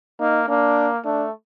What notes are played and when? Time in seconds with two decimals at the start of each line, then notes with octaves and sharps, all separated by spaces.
0.20 A#3 D#4
0.49 A#3 D4
1.05 A3 D4